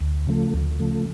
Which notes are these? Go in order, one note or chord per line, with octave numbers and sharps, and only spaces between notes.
D2
C#3 F3 A3
D2
C#3 F3 A3